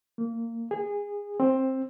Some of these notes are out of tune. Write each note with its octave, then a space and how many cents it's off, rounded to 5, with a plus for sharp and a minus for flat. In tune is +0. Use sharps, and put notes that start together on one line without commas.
A#3 -20
G#4 -25
C4 +10